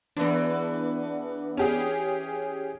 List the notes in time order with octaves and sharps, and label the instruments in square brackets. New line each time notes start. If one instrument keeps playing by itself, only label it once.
[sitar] E2 E3 [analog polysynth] B3 D4
[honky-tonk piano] C#4 G4 G#4